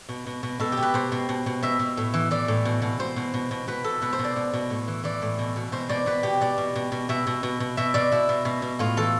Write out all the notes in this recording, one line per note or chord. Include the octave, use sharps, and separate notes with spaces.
B2
B2
B2
B2 A4
G4
B2
B4
B2 C5
B2
B2
B2
B2 E5
B2
A2
E3
E3 D5
A2
B2
B2
B2 C5
B2
B2
B2
B2 B4
B2 A4
B2 B4
C5
B2
D5
B2
B2
A2
E3
E3 D5
A2
B2
B2
B2 C5
B2 D5
B2 B4
B2 G4
B2 D5
B2
B2
B2
B2 E5
B2
B2
B2
B2 E5
B2 D5
B2 E4
B2
B2
B2
A2 F4
E3 A4